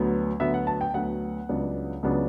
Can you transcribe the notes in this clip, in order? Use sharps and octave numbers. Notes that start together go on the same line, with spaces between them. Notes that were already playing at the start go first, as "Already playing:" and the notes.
Already playing: D2 D3 F#3 B3
D2 D3 F#3 B3 E5
F#5
A5
G5
D2 D3 F#3 B3 F#5
C#2 C#3 F#3 B3 D4
C#2 C#3 F#3 B3 D4